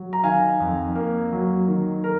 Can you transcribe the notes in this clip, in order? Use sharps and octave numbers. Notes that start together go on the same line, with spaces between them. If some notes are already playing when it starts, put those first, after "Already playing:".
Already playing: F#3
A#5
D#3 F5 G#5
F2
A#3
F#3
D#3
A#4